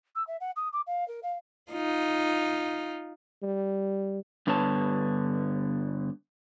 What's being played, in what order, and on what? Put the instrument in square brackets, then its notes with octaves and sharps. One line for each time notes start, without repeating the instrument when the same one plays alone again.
[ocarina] E6
E5
F#5
D#6
D6
F5
A#4
F5
[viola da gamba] D#4 F4
[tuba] G3
[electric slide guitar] G2 D3 B3 C#5 A5